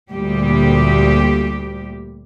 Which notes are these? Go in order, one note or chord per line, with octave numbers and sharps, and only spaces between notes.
D2 A#2 G3 G4